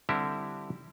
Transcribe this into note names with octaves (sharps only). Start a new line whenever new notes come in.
D3 G3 C4 E4 G4